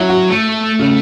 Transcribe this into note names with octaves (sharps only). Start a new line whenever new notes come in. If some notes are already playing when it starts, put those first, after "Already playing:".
Already playing: F#3 C#4 E4
F#4
A3
C#3